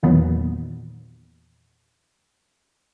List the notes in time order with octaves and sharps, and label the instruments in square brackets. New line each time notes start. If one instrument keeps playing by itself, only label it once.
[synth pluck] E2 A#2 D#3 F#3 B3